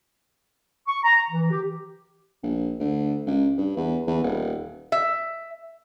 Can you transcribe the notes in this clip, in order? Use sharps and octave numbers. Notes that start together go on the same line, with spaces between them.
C#6
A#5
E3
G4
A#1
D2
C#2
G2
E2
E2
D#1
E5